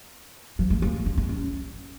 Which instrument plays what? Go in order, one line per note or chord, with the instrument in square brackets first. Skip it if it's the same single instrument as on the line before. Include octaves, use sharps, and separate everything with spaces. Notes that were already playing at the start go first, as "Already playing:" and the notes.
[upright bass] F3
A3
A#3
D4
D#4
C#4